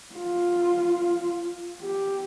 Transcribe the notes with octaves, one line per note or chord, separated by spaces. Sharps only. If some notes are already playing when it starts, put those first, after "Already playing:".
F4
G4